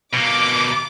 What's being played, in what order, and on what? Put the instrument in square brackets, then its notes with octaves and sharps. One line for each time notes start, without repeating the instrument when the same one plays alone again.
[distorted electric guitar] B2 A#3 [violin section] D6